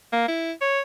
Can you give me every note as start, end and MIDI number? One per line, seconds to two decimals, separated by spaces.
0.12 0.27 58
0.28 0.52 64
0.61 0.80 73